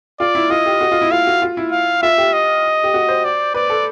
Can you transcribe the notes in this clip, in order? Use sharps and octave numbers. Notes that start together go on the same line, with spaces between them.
F4 D5
E4
F4 D#5
G4
F#4
F4
E4
F4 F5
F#4
F4
E4
F5
F4 E5
G4
D#5
G4
F#4
C5
D5
B4 D5
A4